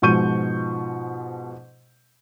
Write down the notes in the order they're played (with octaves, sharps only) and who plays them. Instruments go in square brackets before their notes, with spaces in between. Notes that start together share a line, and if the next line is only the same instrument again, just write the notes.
[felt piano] G#2 B2 F3 C#6 G6 D#7